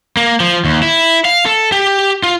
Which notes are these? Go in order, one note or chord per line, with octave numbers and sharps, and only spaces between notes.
A#3
F3
D#2
E4
F5
A4
G4
F4